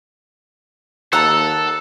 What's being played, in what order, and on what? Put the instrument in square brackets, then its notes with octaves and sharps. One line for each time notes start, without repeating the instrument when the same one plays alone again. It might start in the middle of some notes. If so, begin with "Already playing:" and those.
[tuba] D#2 [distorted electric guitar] A4 [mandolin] F#5 A5 A#5 [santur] E6